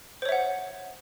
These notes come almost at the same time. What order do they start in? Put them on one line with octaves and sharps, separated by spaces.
C5 C#5 E5 F#5